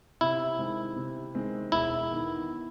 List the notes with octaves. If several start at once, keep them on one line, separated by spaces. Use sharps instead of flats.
C3 E4
D#3 G#3 C4
C3
D#3 G#3 C4
E1 E4
E2 D#3